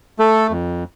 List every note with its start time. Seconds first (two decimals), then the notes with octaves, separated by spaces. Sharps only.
0.19 A3 A4
0.50 F2